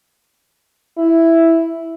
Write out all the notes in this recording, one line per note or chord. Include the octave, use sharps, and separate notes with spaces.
E4